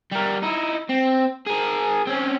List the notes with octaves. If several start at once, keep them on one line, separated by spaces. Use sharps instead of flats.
G3 A#4
D#4 E4
C4
G#4 A#4
C4 C#4